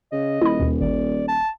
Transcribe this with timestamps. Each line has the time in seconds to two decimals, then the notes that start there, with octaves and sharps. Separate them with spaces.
0.12 C#3 D#5
0.42 D#1 E4 B5
0.60 D#2 B2
0.81 G#1 D5
1.28 A5